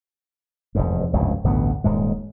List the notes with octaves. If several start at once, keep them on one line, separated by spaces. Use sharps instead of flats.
F1 E2 G#2
F1 C#2 G2 B2
A1 D2 G2 B3
D#1 G#2 G#3